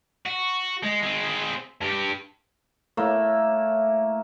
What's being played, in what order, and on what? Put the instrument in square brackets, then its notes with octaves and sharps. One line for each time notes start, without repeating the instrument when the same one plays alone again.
[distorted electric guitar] F#4
G#3
G#3 C4
G2 G4
[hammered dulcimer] A2 A#3 E5